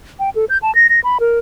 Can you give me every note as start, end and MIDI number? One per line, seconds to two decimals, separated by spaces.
0.19 0.30 79
0.35 0.45 69
0.49 0.58 91
0.62 0.74 81
0.75 0.87 94
0.89 1.00 94
1.04 1.18 83
1.20 1.39 70